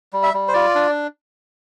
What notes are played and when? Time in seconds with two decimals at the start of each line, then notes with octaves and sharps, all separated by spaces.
0.13 G3
0.23 E5
0.34 G3
0.48 C5
0.54 F4 D5
0.75 D4